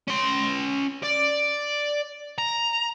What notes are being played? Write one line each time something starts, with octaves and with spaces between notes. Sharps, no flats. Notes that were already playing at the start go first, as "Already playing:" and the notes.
C#4 C6
D5
A#5